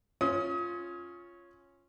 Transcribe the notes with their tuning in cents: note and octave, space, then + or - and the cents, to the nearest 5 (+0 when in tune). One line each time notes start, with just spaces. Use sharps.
C#4 -5 F4 +0 D#6 +35